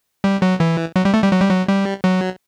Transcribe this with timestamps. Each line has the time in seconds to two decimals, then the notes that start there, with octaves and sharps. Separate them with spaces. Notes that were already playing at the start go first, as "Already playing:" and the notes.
0.24 G3
0.42 F#3
0.60 E3
0.96 F#3
1.05 G3
1.14 A3
1.23 G3
1.32 F#3
1.40 G3
1.49 F#3
1.68 G3
2.04 F#3